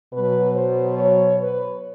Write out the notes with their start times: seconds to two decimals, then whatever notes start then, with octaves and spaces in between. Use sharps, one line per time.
0.13 B2 F#3 B4
0.56 C5
0.99 C#5
1.41 B4